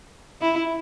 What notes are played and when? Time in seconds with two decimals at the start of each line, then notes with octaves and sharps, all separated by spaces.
0.41 E4